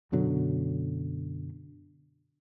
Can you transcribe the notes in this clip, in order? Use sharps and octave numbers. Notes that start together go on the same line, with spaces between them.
F#2 B2 D3 F#3